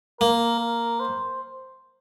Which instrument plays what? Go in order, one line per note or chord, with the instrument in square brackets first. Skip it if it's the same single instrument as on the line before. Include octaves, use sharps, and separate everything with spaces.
[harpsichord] A#3 [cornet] A#4
[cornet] A#4
C5